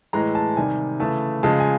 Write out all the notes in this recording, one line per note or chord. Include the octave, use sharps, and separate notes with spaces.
A2 E3 G#3 A#5
A5
C3 D#3 G3 G#5
C#3 E3 A3 A5
C#3 F3 G#3 A5
G#5